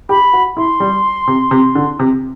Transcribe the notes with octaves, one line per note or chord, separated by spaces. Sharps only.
G4 B5
F#4
E4 C6
G3
C3
C3
D3
C3